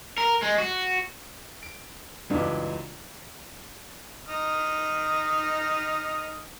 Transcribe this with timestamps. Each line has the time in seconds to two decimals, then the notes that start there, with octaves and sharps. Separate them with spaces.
0.18 A#4
0.42 G#3
0.58 F#4
1.63 D7
2.30 C#2 F#2 E3 G3 D4
4.29 D#4 D#6 F6